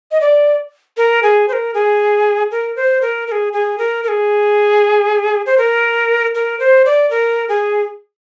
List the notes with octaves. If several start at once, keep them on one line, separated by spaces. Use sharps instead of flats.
D#5
D5
A#4
G#4
C5
A#4
G#4
A#4
C5
A#4
A#4
G#4
G#4
A#4
A#4
G#4
C5
A#4
A#4
C5
D5
A#4
G#4